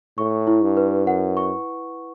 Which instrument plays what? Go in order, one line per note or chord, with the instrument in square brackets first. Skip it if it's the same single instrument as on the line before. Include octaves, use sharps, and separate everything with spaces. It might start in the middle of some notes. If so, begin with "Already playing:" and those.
[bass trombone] A2 [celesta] C#6
[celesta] E4
[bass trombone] G2
[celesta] B4
[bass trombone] F#2 [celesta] F#5
[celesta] C#6